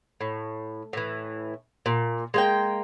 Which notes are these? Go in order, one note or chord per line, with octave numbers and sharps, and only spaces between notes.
A2
A2 E3
A#2
G#3 A#3 G5